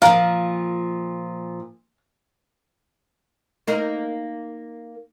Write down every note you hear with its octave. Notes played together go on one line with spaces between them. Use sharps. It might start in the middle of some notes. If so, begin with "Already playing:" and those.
A#2 F3 A#4 F5
A#3 D#4 A#4